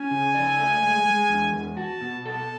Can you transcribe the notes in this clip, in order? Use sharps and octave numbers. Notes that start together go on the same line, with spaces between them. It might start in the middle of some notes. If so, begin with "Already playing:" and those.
Already playing: C#4 G#5
C#3
D5
A3
G#3
G#3
E2
E2
F#4 A5
B2
A4 A5